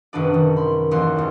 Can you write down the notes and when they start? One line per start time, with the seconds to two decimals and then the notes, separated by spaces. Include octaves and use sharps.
0.13 G#1 F#2 C3 D4 B4 D5
0.34 D#3
0.57 B5 C6
0.91 A1 D#2 C6 F#6
1.16 E2 A4